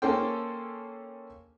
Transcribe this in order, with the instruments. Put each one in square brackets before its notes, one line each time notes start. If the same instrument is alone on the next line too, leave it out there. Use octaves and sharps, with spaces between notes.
[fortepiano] A#3 C#4 G#4 A4 C5 G5